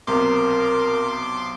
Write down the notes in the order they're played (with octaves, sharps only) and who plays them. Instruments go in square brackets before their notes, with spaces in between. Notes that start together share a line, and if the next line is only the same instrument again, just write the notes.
[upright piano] B1 C3 [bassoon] A#4 [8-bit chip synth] C6 D6